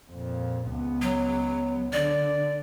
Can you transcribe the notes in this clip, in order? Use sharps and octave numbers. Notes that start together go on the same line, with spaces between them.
F2 A#2
C#2 B3
F#3
D3 D4 D5